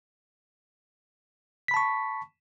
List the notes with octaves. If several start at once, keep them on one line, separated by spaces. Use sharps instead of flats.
A5 B5 C#6 B6